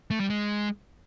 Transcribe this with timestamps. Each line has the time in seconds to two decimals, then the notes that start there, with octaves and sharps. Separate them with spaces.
0.10 A3
0.20 G3
0.30 G#3